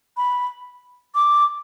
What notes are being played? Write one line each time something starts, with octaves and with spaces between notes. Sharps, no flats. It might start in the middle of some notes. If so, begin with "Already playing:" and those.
B5
D6